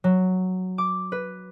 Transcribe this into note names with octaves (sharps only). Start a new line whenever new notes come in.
F#3
D6
B4